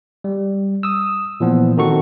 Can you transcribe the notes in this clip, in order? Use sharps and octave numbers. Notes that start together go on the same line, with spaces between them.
G3
D#6 E6
A#2 E3 F3 B3
D#3 C4 D#4 F#4 A4 C#6